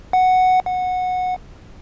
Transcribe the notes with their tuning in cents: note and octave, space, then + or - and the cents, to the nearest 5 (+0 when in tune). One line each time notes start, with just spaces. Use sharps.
F#5 +0
F#5 -15